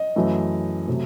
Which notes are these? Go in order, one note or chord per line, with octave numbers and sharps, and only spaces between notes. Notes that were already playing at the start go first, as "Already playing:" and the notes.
Already playing: D#5
F#2 E3 A3
C3 F#3 A3